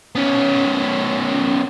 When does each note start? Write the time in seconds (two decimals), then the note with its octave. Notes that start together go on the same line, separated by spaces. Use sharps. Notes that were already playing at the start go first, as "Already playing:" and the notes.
0.15 B3 C#4